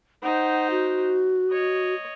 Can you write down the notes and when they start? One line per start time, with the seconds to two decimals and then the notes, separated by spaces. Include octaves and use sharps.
0.23 D#4 C5 F#5
0.71 F#4
1.51 C#5 D#5